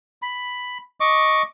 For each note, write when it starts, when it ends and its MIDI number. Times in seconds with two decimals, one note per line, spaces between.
0.22 0.78 83
1.00 1.42 75
1.00 1.42 85
1.00 1.42 86